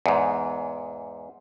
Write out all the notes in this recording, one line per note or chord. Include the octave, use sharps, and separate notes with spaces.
E2 G#2